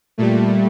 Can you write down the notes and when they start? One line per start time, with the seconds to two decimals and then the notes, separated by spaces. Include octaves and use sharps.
0.18 A#2 G3 A3